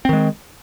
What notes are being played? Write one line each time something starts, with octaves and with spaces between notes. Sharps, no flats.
D#3 G#3 C4